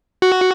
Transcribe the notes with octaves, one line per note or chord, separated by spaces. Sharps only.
F#4